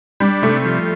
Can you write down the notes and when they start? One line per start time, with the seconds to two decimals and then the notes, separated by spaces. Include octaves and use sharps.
0.20 G3 D4
0.42 C3 A3
0.65 F3